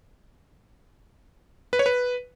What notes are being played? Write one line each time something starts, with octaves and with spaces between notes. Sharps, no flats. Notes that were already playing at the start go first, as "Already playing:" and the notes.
B4
C#5
B4